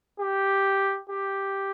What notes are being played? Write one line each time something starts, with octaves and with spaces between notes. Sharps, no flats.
G4
G4